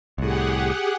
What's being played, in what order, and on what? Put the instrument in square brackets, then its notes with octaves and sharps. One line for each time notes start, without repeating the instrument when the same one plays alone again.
[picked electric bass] C2 A2 [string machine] G4 G#4 F#5